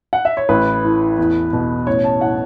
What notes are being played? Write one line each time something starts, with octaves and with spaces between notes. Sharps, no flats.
F#5
E5
C#5
A1 B4
A2
E2
B2
A1 C#5
A5
A2 F#5